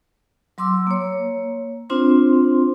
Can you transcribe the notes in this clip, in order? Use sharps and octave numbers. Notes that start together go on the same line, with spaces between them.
F#3 C6 D6 E6
A#3 C#5
C4 D4 F4 C5 C6